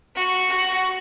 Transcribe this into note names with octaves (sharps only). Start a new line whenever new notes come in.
F#4
F#4